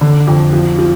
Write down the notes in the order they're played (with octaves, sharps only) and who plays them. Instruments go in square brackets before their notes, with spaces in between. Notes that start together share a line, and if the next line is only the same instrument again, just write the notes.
[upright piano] D3
F2
F3
F3